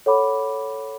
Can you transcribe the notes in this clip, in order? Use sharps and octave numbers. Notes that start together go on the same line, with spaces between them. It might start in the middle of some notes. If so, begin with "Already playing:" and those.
A4 C#5 F#5 B5 D6